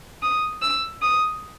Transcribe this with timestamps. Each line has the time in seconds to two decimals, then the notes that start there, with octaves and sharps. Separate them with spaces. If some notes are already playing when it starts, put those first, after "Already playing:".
0.22 D#6
0.62 E6
1.02 D#6